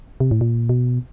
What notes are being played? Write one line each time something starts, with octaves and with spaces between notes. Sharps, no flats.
C3
A2
A#2
B2